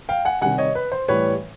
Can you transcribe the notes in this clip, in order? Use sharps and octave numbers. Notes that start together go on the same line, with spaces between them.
F5 G5
F#5 G#5
C3 D#3 G3 F#5 G#5
C#5 D#5
B4
C5
A2 E3 G3 B4 C#5